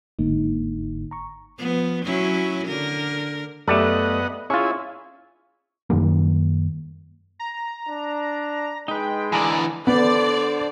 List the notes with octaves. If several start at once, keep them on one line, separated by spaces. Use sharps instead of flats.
G1 G#2 D3 A#3 D#4
A#5 C#6
F3 B3
F#3 C#4 E4
D3 A#4
F#2 A3 B3 G4 A4 D5 D#5 F#5
C#4 E4 F4 G#4 C#6
F#2 D#3 G3 A#3
A#5
D4
G#3 D#4 B4 G5
D3 E3 G#4 A#4 D5 D#5
D3 B3 C5 D5